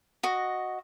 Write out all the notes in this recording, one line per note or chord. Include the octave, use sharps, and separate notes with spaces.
F#4 D#5